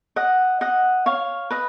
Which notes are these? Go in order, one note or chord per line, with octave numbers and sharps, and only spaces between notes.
D#5 F#5
D#5 F#5
C#5 F5
B4 D#5